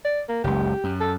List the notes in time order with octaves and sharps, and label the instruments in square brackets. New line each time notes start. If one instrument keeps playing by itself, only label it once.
[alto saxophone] D5
A#3
[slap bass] F#1 C#2 [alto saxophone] G4
[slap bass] F#2
[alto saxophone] A4